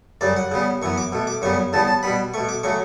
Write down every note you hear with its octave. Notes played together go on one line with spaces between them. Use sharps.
F#2 C#3 G3 D5
F#5
C#3 G3 B3
F#2 E3 B3 C#6
D6
B2 A3
D6
F#2 C#3 G3 B3 C#6
E2 C#3 G3 B3 A5
A5
B2 G3 B3 B5
B2 A3 C#6
D6
C#3 F#3 A3 C#6